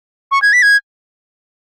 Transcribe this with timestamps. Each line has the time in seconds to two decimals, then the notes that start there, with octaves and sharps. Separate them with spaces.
0.32 C#6
0.42 G#6
0.53 B6
0.62 G#6